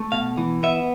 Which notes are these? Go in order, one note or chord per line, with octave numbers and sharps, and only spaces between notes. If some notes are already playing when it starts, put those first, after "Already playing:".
Already playing: A3
B2 F5
E3
B3 E5